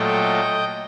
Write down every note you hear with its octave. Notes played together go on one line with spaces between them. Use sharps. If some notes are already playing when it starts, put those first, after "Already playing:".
Already playing: A#2 F#3 A3 D#5 G5